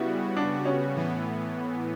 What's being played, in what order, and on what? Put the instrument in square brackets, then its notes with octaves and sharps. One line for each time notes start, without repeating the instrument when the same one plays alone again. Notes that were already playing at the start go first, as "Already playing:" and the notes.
Already playing: [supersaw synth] C#3 G3 B3 F#4 [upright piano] E4
[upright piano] D4
C#4
[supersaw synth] A2 E3 B3